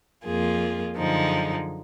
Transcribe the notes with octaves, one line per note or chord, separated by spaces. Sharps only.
F2 F3 A#3 F4 G#4
F#2 D3 F3 G#3 D#4